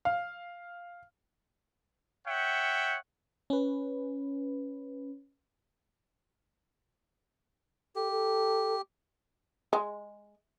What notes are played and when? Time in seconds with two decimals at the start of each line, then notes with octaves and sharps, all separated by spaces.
0.05 F5
2.27 C#5 E5 F#5 G5
3.50 C#4 B4
7.96 G4 A4
8.11 A4
9.73 G#3